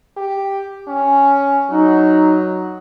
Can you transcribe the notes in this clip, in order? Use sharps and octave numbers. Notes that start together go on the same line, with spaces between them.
G4
C#4
F#3 D#4